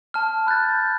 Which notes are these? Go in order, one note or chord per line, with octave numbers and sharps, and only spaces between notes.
A5 F6
B5 F#6 G6 A6
G6